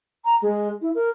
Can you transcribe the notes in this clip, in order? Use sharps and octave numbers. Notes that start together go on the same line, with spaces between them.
A#5
G#3
E4
A#4